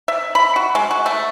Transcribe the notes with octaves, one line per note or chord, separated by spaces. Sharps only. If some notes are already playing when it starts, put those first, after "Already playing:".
E5
B5
F#4
G#3
F#4
A3